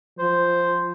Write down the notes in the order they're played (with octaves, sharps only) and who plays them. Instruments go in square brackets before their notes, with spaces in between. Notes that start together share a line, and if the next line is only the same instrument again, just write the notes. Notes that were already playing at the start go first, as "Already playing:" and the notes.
[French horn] F3 [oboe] C5